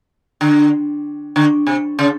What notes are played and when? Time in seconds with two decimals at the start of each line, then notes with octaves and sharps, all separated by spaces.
0.41 D3
1.36 D3
1.67 C3
1.99 C#3